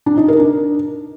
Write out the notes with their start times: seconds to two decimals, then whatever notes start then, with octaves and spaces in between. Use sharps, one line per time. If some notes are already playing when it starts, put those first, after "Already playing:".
0.06 D4
0.17 D#4
0.28 A#4
0.39 D4